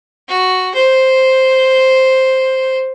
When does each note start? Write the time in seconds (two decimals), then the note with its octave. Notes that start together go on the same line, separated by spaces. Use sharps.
0.28 F#4
0.75 C5